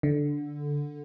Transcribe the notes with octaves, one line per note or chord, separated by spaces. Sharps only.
D3